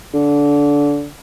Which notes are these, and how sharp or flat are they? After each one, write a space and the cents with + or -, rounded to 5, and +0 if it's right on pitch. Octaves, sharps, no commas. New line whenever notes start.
D3 -20